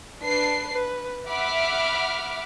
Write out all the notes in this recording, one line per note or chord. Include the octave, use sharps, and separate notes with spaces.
D4 B4 C7
B4
E5 F#5 B5 D6 F6